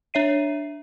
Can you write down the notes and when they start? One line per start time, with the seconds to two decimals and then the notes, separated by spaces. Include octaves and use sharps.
0.14 D4 C#5 E5 C7 D#7